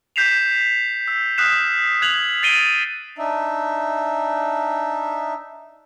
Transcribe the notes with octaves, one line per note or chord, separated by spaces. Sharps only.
G6 B6 C7 E7 F7
E6
D#6 F6 F#6 B6 C7 E7
F#6 G#6 F7 F#7
G#6 A6 C7 D7 D#7 G7
D4 D#4 E5